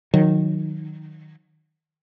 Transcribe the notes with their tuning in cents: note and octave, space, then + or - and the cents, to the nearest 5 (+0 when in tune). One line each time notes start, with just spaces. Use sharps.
D#3 -5 F#3 -20